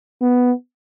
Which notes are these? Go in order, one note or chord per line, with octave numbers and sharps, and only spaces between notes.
B3